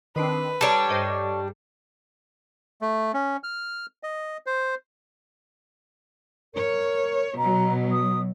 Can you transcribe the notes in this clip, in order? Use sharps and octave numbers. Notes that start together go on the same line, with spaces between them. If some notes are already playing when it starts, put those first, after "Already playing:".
D#3 C4 D4 B4
G3 D4 A4 C#5 A5 A#5
G2 C5 D#5 G5
A3
C#4
F6
D#5
C5
A#4 C#5
B2 F#3 A#5
D#6